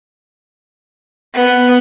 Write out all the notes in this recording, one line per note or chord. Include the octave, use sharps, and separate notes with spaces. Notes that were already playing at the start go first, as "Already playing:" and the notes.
B3